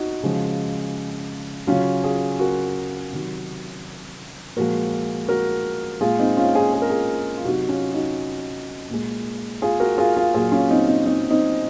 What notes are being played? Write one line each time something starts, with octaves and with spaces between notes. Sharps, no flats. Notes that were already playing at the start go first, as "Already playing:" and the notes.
Already playing: D#4 F#4
C#3 F3 G#3
C#3 F#3 C#4 F4
F4 G#4
F#4 A#4
C3 D#3 F#3
A#2 F3 G#3 F#4 A#4
F#4 A#4
A#2 G#3 F4 G#4
C4 D#4
C#4 F4
F4 G#4
G#4
A#4
F4 G#4
F4
C3 F#3 D#4 F#4
C#4 F4
D#4 F#4
A#2 G#3
F4 G#4
F#4 A#4
F4 G#4
F4 G#4
A#2 F#3 F4 G#4
C#4 F4
C4 D#4
C4 D#4
C4 D#4
C4 D#4